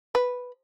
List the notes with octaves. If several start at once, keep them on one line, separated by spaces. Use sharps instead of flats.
B4